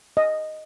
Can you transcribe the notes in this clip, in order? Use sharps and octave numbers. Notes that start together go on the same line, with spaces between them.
D#5